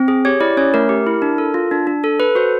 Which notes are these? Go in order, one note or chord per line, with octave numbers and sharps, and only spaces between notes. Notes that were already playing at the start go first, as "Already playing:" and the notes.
Already playing: C4
G#4
G4 C#5
E4 D5
C#4 C#5
A3 A#4
G4
E4
D4
A4
F4
D4
D4
A4
A4 B4
F#4 C5